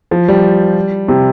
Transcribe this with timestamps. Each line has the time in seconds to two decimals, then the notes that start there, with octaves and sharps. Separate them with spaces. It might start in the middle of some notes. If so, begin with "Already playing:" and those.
0.11 F3
0.28 G3
1.08 C3